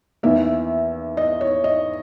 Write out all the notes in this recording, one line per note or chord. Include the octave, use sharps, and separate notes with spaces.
E2 D#3 A#3 E5
D#5
C#5
D#5